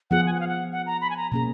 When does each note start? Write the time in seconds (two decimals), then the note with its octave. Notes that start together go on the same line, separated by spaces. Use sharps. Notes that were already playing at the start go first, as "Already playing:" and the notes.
0.10 F3 B3 F4 G#4 F#5
0.26 G#5
0.33 F#5
0.40 F5
0.48 F#5
0.72 F#5
0.86 A#5
1.01 B5
1.10 G#5
1.17 A#5
1.32 B2 A#3 C#4 G#4 A#5